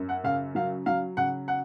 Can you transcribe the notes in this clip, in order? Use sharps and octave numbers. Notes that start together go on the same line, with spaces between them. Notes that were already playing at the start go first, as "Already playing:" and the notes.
Already playing: F#2
F#5
C#3 F5
F#3 F5
F#3 F5
C#3 F#5
F#5